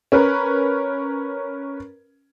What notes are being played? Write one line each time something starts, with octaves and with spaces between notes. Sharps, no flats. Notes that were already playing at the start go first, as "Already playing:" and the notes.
C#4 A#4 B4